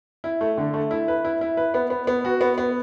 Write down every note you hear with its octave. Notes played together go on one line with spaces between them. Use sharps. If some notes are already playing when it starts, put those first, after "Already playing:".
E4
A3
D3
A3
E4
B4
E4
E4
B4
B3
B3
B3
F#4
B3
B3